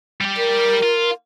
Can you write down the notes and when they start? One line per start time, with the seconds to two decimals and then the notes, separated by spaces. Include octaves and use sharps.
0.21 G3 G4
0.37 A#4
0.82 F4